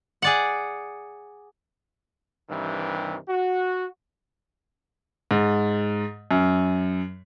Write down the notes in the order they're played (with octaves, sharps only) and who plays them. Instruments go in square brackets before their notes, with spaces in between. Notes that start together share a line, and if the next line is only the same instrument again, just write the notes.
[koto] G#4 D5 F#5
[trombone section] G2 C3 D#3 E3
F#4
[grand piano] G#2
F#2